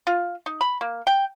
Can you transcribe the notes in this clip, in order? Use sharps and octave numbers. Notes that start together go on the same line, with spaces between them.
F4
D#4
B5
A#3
G5